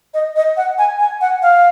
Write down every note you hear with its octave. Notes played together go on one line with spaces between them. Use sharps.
D#5
D#5
F#5
G#5
G#5
F#5
F5